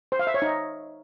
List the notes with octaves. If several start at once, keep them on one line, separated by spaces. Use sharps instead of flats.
C5
F5
E5
C#5
D#4